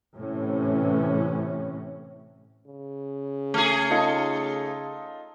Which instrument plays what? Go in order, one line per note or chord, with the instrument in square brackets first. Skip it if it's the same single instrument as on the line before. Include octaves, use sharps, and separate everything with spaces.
[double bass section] A2 C3 E3 C#4
[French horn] C#3
[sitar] A3 G#4
[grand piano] D#4 F4 A4